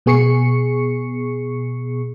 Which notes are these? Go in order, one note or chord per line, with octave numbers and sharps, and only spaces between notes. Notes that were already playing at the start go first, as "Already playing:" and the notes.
B2 B3 G#4 C#6 C7 C#7